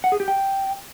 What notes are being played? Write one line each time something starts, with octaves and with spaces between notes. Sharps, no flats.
F#5
G#4
G4
G5